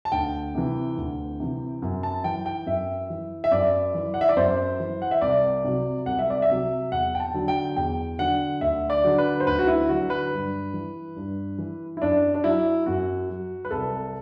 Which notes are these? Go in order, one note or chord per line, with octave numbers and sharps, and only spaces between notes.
A5
D2 G5
C3 E3
D2
C3 E3
F#2
A5
E3 G5
G5
F#2 E5
E3
E5
F#2 D5
E3
F#5
E5
D5
F#2 C5
E3
F#5
E5
C2 D5
C3 F#3
C2 F#5
E5
D5
E5
C3 F#3
E2 F#5
G5
A5
D3 F#3
G5
E2 G5
D3 F#3 F#5
D2 E5
D5
D3 F#3
B4
C5
D2 B4
F#4
E4
D3 F#3 F#4
B4
G2
E3
G2
E3
E4
F#2 D4
D4
F#3 E4
F#2 F#4
F#3
B4
C2 A4